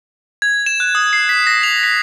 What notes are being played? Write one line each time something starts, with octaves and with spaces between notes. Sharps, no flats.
G#6
E7
F#6
D#6
C7
B6
A#6
F7
B6